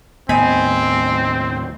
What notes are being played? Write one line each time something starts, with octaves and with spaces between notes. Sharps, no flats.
D#2 A2 B3 C4 D#4 G#5 B5